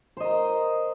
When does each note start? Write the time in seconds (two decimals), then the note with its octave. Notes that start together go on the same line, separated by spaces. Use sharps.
0.17 C5
0.20 D#5
0.24 A#4